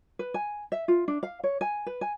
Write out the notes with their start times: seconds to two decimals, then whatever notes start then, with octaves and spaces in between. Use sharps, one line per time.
0.19 B4
0.34 G#5
0.72 E5
0.88 F4
1.08 D4
1.23 F5
1.44 C#5
1.61 G#5
1.86 B4
2.01 G#5